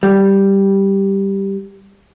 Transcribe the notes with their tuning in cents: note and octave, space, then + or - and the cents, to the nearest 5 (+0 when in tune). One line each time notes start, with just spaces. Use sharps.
G3 +0